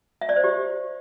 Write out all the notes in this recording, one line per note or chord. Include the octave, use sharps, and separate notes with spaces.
E5
D5
C5
G4